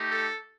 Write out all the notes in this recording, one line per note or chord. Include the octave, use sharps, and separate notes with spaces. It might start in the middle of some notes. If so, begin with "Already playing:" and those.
Already playing: A3 D#4 G4
A4